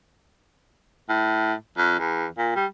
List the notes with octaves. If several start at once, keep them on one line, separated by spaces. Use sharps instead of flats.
A2
F2
E2
A#2
G3